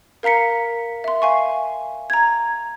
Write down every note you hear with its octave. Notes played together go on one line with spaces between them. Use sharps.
A#4 F5 A#5 B6 C#7
E5 C6
F5 G#5 C#6
A#5 G#6